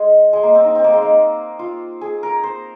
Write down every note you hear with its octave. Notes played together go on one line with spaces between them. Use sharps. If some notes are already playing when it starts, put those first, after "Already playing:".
Already playing: G#3
G#3
A#3
C4
D#4
C4
A#3
G#3
A#3
F4
G#4
A#4
C5